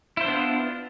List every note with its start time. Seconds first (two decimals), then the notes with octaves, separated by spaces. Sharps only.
0.17 E4
0.21 C5
0.24 D4
0.28 B3
0.32 F4